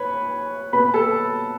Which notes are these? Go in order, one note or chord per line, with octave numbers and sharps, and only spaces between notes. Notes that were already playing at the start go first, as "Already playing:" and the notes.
Already playing: B4 C#5 B5
B2 B3 B4 B5
A4 A5